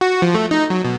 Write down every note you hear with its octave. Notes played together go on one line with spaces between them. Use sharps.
F#4
F3
A3
D#4
F#3
B2